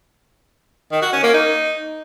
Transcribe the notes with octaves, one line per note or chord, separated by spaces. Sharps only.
D#3
F#4
C#4
A#3
D#4